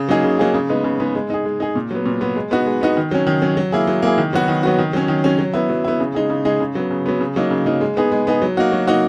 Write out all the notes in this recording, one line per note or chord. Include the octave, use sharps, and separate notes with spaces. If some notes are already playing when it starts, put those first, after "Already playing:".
Already playing: C#3
F#3 A#3 D#4 G#4
C#3
F#3 A#3 D#4 G#4
C#3
G#3 B3 D#4
C#3
G#3 B3 D#4
G#3
D#4 G#4
G#3
D#4 G#4
A#2
F#3 B3
A#2
F#3 B3
G#3
B3 D#4 F#4
G#3
B3 D#4 F#4
D#3
F#3 C#4
D#3
F#3 C#4
F#3
A#3 E4 G#4
F#3
A#3 E4 G#4
D#3
F#3 B3 F#4
D#3
F#3 B3 F#4
D#3
F#3 C#4
D#3
F#3 C#4
F#3
B3 E4
F#3
B3 E4
C#3
G#3 D#4 G#4
C#3
G#3 D#4 G#4
C#3
F#3 B3
C#3
F#3 B3
C#3
F#3 A#3 D#4
C#3
F#3 A#3 D#4
G#3
B3 D#4 G#4
G#3
B3 D#4 G#4
F#3
A#3 D#4 F#4
F#3
A#3 D#4 F#4